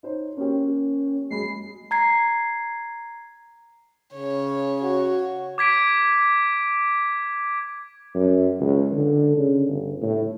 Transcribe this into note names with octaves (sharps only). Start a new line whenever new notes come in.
D#4 C5 C#5
A#3 C#4 G4
F#2 G#3 B5 C7
A#5 G#6 C7
C#3 C#5
F#4 C#5
D6 G#6 B6 D7
F#2
C#2
D3
C#3
G1
A2